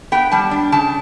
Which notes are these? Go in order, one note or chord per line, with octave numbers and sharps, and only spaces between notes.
B3 G5
G3 A5
D4
C#3 A5